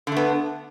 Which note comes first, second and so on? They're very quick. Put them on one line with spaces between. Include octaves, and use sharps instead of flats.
D3 A3 B3